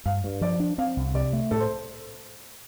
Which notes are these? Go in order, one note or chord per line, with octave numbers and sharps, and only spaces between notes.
G2 F5
G2
F3 D5
D4
C4 F5
C2
C3 D5
A3
A2 A4
C5